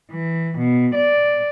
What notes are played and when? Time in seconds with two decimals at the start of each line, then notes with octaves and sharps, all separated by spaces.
0.11 E3
0.58 B2
0.95 D5